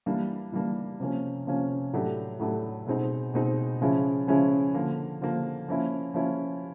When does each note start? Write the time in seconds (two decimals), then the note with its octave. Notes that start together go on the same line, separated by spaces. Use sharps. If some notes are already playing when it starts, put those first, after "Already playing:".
0.06 E3 G3 A#3 D4
0.52 E3 G3 A#3 D4
1.00 C3 F3 A#3 C#4
1.47 C3 F3 A#3 C#4
1.93 A2 F#3 A3 D4 G4
2.39 A2 F#3 A3 D4 G4
2.87 B2 G#3 C4 D#4
3.34 B2 G#3 C4 D#4
3.81 C#3 F3 G#3 C#4 E4
4.27 C#3 F3 G#3 C#4 E4
4.74 D3 F3 A#3
5.21 D3 F3 A#3
5.68 F3 A#3 C#4 E4
6.14 F3 A#3 C#4 E4